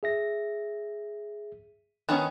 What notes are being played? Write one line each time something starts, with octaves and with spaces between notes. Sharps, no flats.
G#4 E5 A#6
D#3 B3 C#4 D#6 F#6